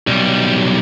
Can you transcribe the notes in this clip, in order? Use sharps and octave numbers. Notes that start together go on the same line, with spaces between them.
B1 G3